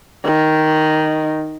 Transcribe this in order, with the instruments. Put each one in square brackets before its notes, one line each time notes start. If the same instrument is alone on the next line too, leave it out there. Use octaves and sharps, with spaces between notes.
[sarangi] D#3